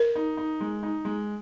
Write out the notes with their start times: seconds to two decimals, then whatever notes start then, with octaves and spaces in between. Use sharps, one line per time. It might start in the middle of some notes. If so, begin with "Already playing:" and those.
Already playing: A#4
0.16 D#4
0.37 D#4
0.60 G#3
0.83 D#4
1.05 G#3